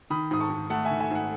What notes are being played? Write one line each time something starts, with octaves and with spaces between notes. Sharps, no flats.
D#3 B5 D#6
G#2 D#6
A5 C#6
G#2
A3 F#5 A5
E5 G#5
D#3
E5 G#5
G#2 F#5